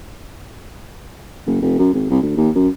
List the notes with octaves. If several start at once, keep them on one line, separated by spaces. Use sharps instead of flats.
F#1
F1
F#2
G#1
C2
D2
D#2
F#2